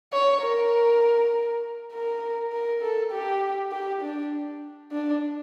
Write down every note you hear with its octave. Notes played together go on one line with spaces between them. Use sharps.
C#5
A#4
A#4
A#4
A4
G4
G4
D4
D4